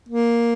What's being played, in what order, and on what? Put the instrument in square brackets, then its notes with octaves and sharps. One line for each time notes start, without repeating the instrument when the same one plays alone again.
[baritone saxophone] A#3